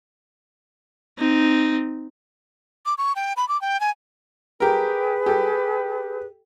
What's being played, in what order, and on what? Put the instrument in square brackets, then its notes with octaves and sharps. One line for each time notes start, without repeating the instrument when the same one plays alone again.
[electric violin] C4 D#4
[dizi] D6
C#6
G5
B5
D6
G5
G#5
[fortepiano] G4 A#4 [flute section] G#4 B4
[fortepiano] G4 A4